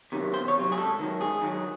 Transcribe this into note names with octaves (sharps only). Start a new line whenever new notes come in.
C3 D#3 F#3
E2 C5
C#5
C3 D#3 F#3
G#4
G#2 A4
D#3 F#3
G#2 G#4
D#3 F#3